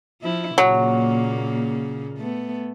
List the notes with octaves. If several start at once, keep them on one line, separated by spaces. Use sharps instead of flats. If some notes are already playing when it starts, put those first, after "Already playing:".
F3 E4
A#2 C#3 F#3 A#3
A3 B3